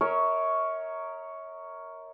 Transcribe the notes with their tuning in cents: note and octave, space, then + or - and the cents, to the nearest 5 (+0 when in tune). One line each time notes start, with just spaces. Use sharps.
A#4 +0 C#5 +5 E5 -40